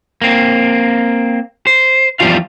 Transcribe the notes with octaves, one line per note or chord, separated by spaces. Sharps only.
A#3 C4
C5
E2 G2 F3 G3 F4 F5